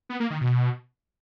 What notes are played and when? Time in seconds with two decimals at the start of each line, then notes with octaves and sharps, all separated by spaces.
0.09 B3
0.20 A#3
0.30 D#3
0.41 B2